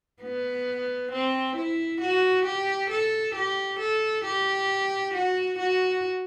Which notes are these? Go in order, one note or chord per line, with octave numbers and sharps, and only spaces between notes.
B3
C4
E4
F#4
G4
A4
G4
A4
G4
F#4
F#4